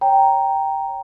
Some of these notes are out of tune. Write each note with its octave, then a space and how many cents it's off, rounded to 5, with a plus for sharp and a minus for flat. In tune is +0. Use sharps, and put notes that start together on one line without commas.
C#5 +10 G5 +0 A#5 +0